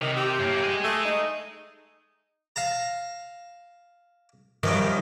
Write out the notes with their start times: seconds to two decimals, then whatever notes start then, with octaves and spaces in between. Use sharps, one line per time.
0.02 C3 D#3
0.17 G4
0.40 F#2 A#3
0.63 G#4 D#5
0.84 A3
1.05 D#4
2.56 F5 A5 A#5
4.63 F#2 D#3 F3 G3